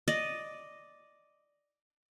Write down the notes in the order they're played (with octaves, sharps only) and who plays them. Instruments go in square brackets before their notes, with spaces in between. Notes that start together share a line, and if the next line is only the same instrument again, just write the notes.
[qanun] D5 D#5